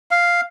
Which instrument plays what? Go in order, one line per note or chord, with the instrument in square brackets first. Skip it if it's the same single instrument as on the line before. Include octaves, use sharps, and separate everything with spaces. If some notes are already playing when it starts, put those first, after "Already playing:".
[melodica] F5